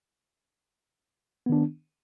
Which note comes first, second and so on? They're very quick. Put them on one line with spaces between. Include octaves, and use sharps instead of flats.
B3 D#3 D4